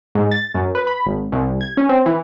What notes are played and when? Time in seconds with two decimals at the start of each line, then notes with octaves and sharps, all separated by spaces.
0.15 G#2
0.31 A6
0.55 F#2
0.75 B4
0.87 B5
1.06 G#1
1.32 C2
1.61 G#6
1.77 C#4
1.89 C4
2.06 E3